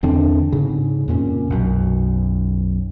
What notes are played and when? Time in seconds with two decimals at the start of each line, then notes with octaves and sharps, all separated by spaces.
0.03 E2 D3 C4 D4
0.52 G#2 C#3
1.08 F2 A#2 C#4
1.50 B1 F#2